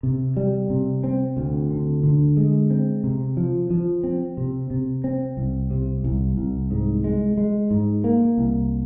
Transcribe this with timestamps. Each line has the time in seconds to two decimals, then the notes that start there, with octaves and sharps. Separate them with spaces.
0.03 C3
0.37 G3
0.70 C3
1.04 C4
1.37 D2
1.71 D3
2.03 D3
2.37 G#3
2.70 C4
3.04 C3
3.37 F3
3.71 F3
4.04 C4
4.37 C3
4.71 C3
5.04 C4
5.37 C2
5.71 C3
6.04 C2
6.37 C2
6.71 G#2
7.04 G#3
7.37 G#3
7.71 G#2
8.04 A#3
8.38 C2